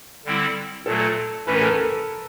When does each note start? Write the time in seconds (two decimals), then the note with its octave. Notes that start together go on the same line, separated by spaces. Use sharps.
0.25 D3 G3 C4 E4
0.86 A#2 F#3 A3 A4
1.47 A2 E3 A3 C#4 B4
1.54 A#4
1.61 A4
1.69 A#4